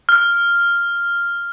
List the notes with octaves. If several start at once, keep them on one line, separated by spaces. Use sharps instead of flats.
F6